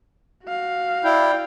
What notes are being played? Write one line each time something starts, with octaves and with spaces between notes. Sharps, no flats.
F#4 F5
E4 D5 G5